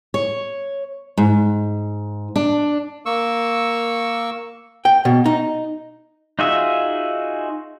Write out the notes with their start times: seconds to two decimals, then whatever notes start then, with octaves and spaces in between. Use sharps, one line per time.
0.14 C#5
1.17 G#2
2.36 D4
3.06 A#3 C#6 E6
4.85 G5
5.05 B2
5.26 D#4
6.39 D#4 F4 F#4 G#4 E5